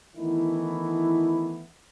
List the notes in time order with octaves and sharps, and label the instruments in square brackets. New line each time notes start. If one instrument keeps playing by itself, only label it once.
[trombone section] D#3 E3 A3 B3 E4